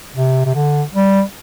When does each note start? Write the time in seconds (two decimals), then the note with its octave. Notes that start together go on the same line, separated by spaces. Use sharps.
0.15 C3
0.46 C3
0.55 D3
0.94 G3